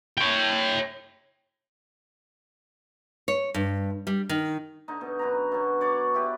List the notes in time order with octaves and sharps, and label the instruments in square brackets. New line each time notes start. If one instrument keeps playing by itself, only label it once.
[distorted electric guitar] C#5 G5
[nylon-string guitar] C#5
G2
G3
D#3
[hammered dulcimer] D3 D#4
B2
F#2 D3 B4 A#5
B2 F#3
C#5 D5 D6
E4 G4 B4